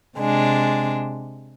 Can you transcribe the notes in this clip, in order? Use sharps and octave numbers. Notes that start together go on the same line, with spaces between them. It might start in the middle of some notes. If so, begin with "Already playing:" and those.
C3 G#3 D4